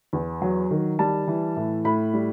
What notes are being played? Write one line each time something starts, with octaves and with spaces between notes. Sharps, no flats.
E2
F#3
D#3
G3 A5
E3
A2
A2 B5
G3